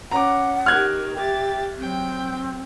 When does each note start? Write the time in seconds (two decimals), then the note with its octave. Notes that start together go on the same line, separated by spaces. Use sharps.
0.11 C#4 F#5 A#5 D6
0.66 D#3 G4 A#4 F6 F#6 G#6
1.15 G4 E5 G5 A6
1.77 F#3 C4 G5